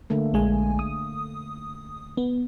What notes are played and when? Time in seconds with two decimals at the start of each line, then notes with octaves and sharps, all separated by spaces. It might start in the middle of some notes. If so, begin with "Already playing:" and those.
0.10 D3 A3 A#3
0.33 A#1 G#3 G#5
0.79 D#6
2.17 B3